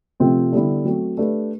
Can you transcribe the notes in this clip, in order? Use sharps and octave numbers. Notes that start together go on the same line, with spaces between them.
C3 F3 A3 C4 F4
D3 G3 B3 E4
F#3 A3 C4
A3 D4 G4 B4